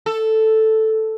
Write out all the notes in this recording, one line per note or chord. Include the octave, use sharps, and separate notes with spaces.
A4